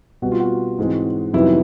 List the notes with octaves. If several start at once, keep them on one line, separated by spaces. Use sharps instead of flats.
B2 G3 C4 F#4
F4
F#4
G#2 E3 G#3 C4
F2 C3 D#3 F#3 B3 E4